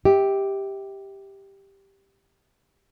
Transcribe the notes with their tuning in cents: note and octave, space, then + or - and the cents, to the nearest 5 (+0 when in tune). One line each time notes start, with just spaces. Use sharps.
G4 +0 E5 -35